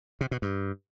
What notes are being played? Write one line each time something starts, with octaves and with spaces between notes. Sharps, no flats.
C3
B2
G2